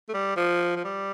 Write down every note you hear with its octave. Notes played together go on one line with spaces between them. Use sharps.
A3
G3
F3
F3
G3